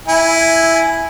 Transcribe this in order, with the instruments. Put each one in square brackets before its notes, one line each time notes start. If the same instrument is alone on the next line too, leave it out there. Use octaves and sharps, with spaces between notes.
[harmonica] E4 G#5